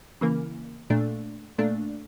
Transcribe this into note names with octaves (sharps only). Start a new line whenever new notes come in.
C#3 E3 A#3
A#2 A3 D4
A#2 A3 D4